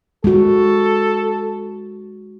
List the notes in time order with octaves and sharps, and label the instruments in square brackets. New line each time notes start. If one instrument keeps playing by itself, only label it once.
[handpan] G#3 F#4 [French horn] A4